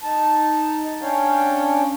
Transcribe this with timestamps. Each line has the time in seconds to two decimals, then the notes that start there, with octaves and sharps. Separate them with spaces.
0.03 D#4 A5
1.01 C#4 D4 C#5 F5 G5